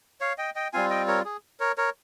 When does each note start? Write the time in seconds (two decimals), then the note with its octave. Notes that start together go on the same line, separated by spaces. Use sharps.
0.21 C#5 F5
0.38 D#5 G5
0.55 D#5 G5
0.73 G3 C4 F4 F5 G#5
0.90 D#5 G5
1.08 A#4 C#5
1.25 G#4
1.60 A#4 C#5
1.78 A#4 C#5